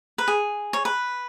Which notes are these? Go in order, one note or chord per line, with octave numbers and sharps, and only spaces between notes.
B4
G#4
C#5
B4